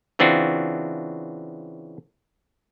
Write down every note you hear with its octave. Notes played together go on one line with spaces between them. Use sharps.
C#3 E3 C4 D4 F4 F#4